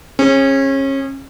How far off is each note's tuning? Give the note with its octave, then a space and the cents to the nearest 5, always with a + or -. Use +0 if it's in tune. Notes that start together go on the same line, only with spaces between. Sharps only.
C#4 -30 G#4 -20